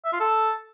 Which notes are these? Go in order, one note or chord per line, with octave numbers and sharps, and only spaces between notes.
E5
F4
A4